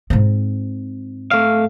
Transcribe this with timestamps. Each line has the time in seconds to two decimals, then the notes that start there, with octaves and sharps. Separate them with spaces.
0.10 G#2 C4
1.31 A3 F5